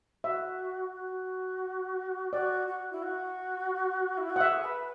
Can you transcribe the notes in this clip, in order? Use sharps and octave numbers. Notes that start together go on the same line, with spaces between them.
F#4 E5
F#4
F#4 D5
F#4
E4
F#4
E4
F#4
F#5
G#4 E5
B4